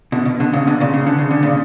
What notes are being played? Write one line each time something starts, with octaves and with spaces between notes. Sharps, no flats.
B2 D3
B2
B2 D3
A#2 C#3
B2 D3
A#2 C#3
C#3
D3
C#3
D3
A#2 C#3